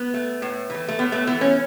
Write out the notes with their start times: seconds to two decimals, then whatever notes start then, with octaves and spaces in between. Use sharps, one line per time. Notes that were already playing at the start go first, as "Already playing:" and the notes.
Already playing: B3
0.14 A3
0.42 A2
0.70 E3 A3
0.88 A3
0.99 A2 B3
1.12 A3
1.27 E3 A3 B3
1.41 C#4